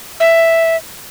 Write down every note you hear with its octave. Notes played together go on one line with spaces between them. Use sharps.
E5